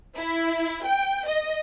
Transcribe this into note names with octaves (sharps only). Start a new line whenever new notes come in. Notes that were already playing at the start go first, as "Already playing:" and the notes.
E4
G5
D#5